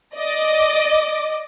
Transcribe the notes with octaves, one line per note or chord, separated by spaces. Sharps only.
D5 D#5 D6